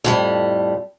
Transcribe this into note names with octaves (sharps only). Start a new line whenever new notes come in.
F2 A2 G3